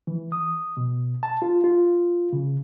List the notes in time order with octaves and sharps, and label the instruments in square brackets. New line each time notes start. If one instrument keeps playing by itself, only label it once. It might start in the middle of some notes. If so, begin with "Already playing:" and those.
[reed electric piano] E3
D#6
B2
A5
F4
F4
C#3